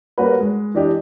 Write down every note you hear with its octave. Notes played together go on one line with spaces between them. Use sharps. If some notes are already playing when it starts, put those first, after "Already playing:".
G3 A#3 C#4 F#4 A#4 B4
G#3
E3 D4 G4 D#5